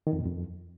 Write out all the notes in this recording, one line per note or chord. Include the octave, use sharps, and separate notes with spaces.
D#3
F2
A#2
F2